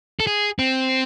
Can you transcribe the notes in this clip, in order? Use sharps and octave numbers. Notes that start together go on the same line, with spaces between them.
A4
G#4
C4